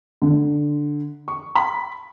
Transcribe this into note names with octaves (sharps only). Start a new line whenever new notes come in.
D3
C#6
B5